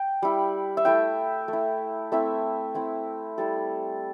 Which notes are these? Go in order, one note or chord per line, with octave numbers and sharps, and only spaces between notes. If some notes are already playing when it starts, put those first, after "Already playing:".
Already playing: G5
G3 E4
E5
A3 E4 G5
A3 E4
A3 C4 E4 E5
A3 C4 E4
G3 E4 A4